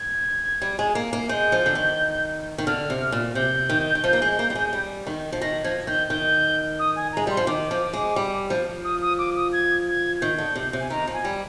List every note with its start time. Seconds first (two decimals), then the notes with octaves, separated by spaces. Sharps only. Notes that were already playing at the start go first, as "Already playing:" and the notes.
Already playing: G#6
0.62 G3
0.79 G#3
0.95 A#3
1.13 A#3
1.29 G#3 G6
1.52 F3
1.66 D3
1.75 D#3
2.58 D#3
2.67 D3 F6
2.90 C3
3.12 A#2
3.35 C3 G6
3.70 D#3
3.95 D#3
4.04 F3
4.13 A#3
4.22 G#3
4.39 A#3
4.50 G3
4.55 G#3
4.73 G3
5.07 D#3
5.32 F3
5.42 D#3 A#6
5.64 F3 G#6
5.87 D#3 G6
6.10 D#3 G6
6.79 D#6
6.96 G#5
7.13 G#3 A#5
7.27 G3 C6
7.37 F3
7.47 D#3 D6
7.71 F3
7.93 G#3
8.16 G3
8.50 F3
8.85 D#6
9.01 D#6
9.19 D6
9.36 D#6
9.53 G#6
9.88 G#6
10.21 D#3 G6
10.38 D3
10.56 C3
10.73 C3
10.80 G#5
10.90 D#3 A#5
11.07 F3
11.14 G#5
11.25 G3